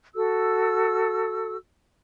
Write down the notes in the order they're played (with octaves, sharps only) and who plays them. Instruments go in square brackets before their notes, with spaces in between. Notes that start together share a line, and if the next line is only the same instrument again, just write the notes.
[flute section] F#4 A4 E6